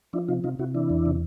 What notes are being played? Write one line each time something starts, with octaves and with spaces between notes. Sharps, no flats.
F3 D4 E4
C3 D#4 F4
C3 D#4 F4
C3 E4 F#4
E3 D4 E4
E2
C3